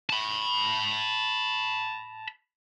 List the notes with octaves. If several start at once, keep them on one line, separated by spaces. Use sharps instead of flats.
A5 B5